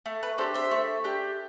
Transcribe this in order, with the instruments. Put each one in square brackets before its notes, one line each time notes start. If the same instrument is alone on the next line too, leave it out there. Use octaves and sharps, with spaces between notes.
[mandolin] A3
B4
D4 G4 A4 C5
C5 E5
A3
D4 G4